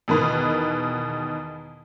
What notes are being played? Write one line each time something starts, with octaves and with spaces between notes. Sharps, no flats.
E2 B2 D#3 B4